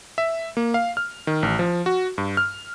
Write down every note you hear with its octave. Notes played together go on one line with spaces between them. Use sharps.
E5
A#3
F5
F6
D#3
A1
F3
F#4
G2
F6